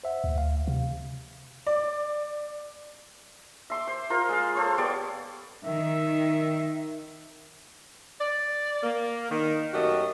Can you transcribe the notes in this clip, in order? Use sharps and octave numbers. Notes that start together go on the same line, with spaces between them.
C5 E5 F#5
D2
F5
C3
D5
E5 C6 D6
C5
F4 A#4 C5
G#3 F5
A4 C5 C#5
B3 G4 C#5 D5
D#3 E5
D5
A#3
D#3
F#2 A3 F#4 G4 D#5